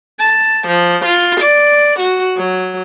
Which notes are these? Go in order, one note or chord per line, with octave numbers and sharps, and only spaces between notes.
A5
F3
F4
D5
F#4
F#3